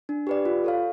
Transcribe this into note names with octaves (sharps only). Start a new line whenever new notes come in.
D4
G4 B4 D5
F4
A4 C#5 F5